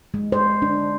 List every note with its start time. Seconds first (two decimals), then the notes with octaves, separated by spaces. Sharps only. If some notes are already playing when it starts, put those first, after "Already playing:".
0.14 G#3
0.32 C5
0.62 D4